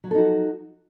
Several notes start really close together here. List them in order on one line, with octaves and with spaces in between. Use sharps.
F#3 F3 A4 D#4 F#4